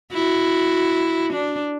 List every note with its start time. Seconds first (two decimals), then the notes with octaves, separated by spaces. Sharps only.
0.13 E4 F#4
1.33 D4